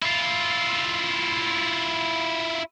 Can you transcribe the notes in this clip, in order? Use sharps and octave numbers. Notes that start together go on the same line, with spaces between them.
E4 F4